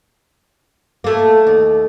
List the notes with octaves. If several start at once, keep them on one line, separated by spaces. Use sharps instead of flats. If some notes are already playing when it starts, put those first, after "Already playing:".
A3 A#3
D#2